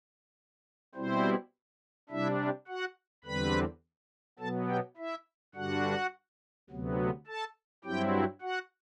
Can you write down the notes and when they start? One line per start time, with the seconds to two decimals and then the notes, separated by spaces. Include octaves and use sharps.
0.95 B2 G3 C4 E4 C5
2.09 C3 G3 D4 E4 E5
2.68 F#4 F#5
3.24 E2 D3 G3 C4 B4 B5
4.39 B2 F#3 B3 A4 A5
4.68 G4 G5
4.97 E4 E5
5.55 G2 D3 G3 D4 F#4 F#5
6.70 D2 C3 F#3 B3
7.27 A4 A5
7.85 G2 F#3 C4 E4 G4 G5
8.41 F#4 F#5